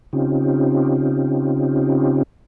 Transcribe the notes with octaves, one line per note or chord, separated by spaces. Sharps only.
C#3 C4 C#4 D#4 F4 G4